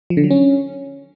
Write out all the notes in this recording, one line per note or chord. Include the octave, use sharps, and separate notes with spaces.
F3
D3
F#3
C#4